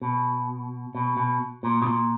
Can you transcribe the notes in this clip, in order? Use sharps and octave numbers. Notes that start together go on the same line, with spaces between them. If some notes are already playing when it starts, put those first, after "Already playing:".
B2
B2
B2
A#2
B2
A#2